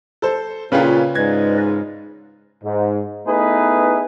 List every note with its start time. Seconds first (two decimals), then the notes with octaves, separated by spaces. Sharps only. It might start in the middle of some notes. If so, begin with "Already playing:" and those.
0.22 A4 C5
0.72 A#2 C#3 C#4 F4 B4 G5
1.16 G#2 B4 D5 D#5 G#6
2.64 G#2
3.26 A3 B3 D#4 E4 G#4 B4